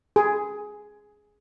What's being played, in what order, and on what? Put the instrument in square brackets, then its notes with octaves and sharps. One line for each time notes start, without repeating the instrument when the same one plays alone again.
[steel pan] G#4